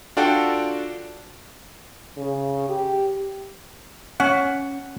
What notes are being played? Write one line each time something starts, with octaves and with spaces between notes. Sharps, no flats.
D4 F4 F#4 A4 G5
C#3
G4
C#4 F#5